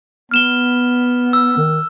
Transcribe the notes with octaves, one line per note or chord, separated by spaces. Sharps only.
B3 F6 E7 G7
E6
D#3